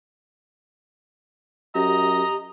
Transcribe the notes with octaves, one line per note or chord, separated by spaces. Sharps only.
F#2 G4 D#5 A#5